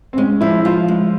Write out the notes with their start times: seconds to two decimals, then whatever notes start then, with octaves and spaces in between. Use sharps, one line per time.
0.13 C4
0.17 G#3 C#4
0.41 F3 E4
0.65 F3 F4
0.88 G#3